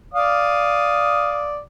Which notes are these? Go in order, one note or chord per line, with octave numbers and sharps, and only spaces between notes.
D5 F5 D#6